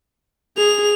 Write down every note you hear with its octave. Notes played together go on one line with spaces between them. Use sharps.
G#4 F7